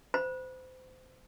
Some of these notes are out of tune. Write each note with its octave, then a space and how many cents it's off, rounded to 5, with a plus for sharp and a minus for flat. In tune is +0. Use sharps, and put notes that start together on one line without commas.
C5 -30 B5 -25